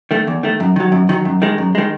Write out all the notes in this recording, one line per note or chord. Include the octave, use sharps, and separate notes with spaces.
D#3 A3
E2
D#3 A3
F#2
D#3 F#3
F#2
D#3 F#3
F#2
D#3 G#3
F#2
D#3 G#3